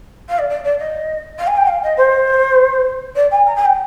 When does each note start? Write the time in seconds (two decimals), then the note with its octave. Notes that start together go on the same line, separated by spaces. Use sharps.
0.28 F5
0.38 D5
0.49 D5
0.64 D5
0.79 D#5
1.38 F5
1.47 G#5
1.57 G5
1.67 F5
1.83 D#5
1.97 C5
3.15 D5
3.31 G#5
3.46 A#5
3.56 G#5
3.65 G5